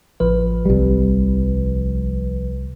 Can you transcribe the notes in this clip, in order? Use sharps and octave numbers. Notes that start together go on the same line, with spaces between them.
A1 F3 B4
C2 G3